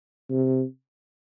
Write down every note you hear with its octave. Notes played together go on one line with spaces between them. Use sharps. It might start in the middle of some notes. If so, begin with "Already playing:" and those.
C3